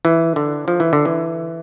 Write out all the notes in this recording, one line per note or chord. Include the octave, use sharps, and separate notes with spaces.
E3
D3
F3
E3
D3
E3